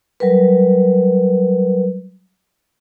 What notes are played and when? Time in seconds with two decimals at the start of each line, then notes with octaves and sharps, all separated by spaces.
0.20 F#3 G3 A#4 B4